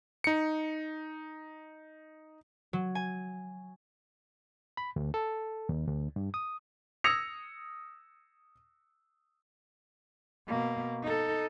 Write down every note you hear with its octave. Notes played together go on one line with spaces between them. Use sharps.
D#4 C#7
F#3
G#5
B5
D2
A4
D#2
D2
G2
D#6
D#6 E6 G#6 A#6 C#7 F7
B2 A#3
D#4 A4